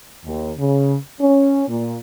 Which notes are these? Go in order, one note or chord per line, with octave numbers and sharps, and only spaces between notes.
D#2
C#3
C#4
A#2